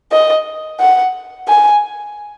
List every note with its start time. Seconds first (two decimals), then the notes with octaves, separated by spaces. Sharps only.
0.12 D#5
0.80 F#5
1.48 G#5